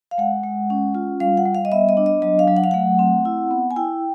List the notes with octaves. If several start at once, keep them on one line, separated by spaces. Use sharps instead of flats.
F5
G#3 F#5
G#3
C#4
F4
G3 F5
F#5
G3
F5
D#5
B3 E5
D#5
D4
D#5
F#3 D#5
F5
F#3
F#5
F5
A3 F#5
C4
E4
B3
G#5
E4 G5